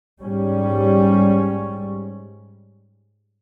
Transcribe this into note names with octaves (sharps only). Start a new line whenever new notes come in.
G#2 G3 C#4